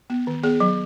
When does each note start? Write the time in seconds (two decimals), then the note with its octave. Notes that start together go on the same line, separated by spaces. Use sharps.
0.10 B3
0.27 D#3
0.43 B3 G#4
0.60 F#3